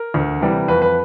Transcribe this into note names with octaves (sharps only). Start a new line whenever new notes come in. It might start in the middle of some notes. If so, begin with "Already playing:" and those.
Already playing: A#4
D2
C3 E3 G3
F2 B4
B4